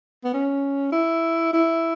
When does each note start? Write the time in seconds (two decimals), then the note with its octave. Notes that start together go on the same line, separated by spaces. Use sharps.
0.25 B3
0.34 C#4
0.92 E4
1.53 E4